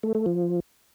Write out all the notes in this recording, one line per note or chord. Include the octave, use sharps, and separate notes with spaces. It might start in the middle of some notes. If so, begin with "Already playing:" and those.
A3
A3
F3